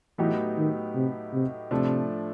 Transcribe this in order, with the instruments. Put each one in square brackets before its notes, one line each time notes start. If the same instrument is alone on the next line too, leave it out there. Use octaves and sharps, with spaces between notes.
[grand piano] A2 F#3 B3 D#4 G4 [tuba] E3
[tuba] D#3
C3
C3
[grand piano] A2 F3 A3 D4 [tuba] C3